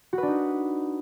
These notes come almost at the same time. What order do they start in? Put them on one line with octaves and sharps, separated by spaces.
F#4 B4 D4 D#4